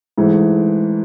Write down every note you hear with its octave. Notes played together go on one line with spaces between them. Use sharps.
G#2 E3 A3